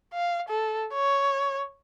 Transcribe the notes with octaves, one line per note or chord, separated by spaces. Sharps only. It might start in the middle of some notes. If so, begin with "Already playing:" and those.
F5
A4
C#5